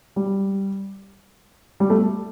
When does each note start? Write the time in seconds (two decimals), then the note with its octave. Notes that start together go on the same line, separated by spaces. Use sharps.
0.16 G3
1.80 G3
1.90 A3